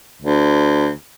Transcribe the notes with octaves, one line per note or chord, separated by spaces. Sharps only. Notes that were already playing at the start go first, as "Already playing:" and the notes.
D2